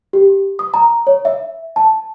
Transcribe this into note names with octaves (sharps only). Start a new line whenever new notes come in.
G4
D#6
A#5
C#5
E5
A5